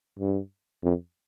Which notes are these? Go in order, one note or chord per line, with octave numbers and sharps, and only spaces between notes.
G2
F2